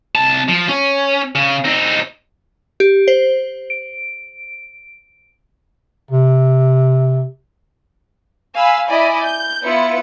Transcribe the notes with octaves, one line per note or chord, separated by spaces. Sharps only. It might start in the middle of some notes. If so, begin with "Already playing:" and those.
C2 A5
F3
C#4
C#3
C4 D#4
G4
C5
D7
C3
F5 G#5 B5 E6
E4 D5 D#5 G#5 B5
G6
B3 E4 F4 B4 C#7